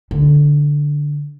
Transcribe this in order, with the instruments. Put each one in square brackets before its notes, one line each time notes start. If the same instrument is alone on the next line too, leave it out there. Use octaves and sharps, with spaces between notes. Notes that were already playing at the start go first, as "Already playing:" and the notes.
[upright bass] D3